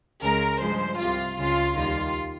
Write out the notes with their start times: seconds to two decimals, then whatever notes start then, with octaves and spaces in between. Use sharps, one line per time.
0.22 C#2 C#3 G#3 A#4
0.61 G2 F3 G#3 C5
0.99 C2 C3 G3 F4
1.38 C#2 C#3 G#3 F4
1.76 D#2 D#3 G3 F4